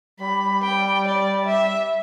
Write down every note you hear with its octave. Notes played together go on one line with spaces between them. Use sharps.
G3 B5
G5
D5
E5